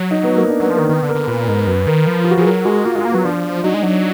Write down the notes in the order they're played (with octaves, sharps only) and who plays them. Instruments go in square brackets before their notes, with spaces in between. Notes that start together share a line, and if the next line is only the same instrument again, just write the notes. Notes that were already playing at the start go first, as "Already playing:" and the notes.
Already playing: [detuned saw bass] F#3
[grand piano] D#4
B3
A#3
D4
[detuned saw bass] F#3 [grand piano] B3
[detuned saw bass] F3
[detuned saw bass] D#3 [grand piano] A#3
[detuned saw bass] D#3 [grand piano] B3
[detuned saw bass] D3
[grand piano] A#4
[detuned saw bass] D3
[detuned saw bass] A#2 [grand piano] B4
[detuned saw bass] G#2 [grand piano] A#4
[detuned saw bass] F#2 [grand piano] B4
[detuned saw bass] D#3 [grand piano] A#4
[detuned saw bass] F3 [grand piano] B4
[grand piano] F4
F#4
[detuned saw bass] F3 [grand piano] G#4
[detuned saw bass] F#3 [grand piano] A#4
[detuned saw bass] G#3 [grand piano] F#4
[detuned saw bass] A#3 [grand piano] F4
[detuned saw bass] G#3 [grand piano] F4
[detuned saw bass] A#3
[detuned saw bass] F#3 [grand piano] B3
[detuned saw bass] F3 [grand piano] D4
[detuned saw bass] F#3 [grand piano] D#4
[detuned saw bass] G#3
[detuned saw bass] F#3 [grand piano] D4